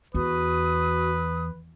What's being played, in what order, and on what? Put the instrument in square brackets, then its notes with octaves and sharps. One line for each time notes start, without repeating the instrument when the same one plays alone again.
[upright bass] E2 [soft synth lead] F#4 [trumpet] B4 [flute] D#6